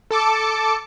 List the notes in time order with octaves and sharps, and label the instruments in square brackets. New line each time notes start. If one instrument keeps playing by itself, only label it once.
[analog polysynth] A4 A5 D6 C#7